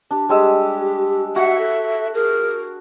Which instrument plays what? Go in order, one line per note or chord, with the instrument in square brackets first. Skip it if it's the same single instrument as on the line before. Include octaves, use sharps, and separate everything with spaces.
[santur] D4 [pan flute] G4
[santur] G3 G#3 E6 [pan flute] G4
[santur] F#4 [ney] E5 [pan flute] F#5
[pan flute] A4
[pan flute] G#4 [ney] A#4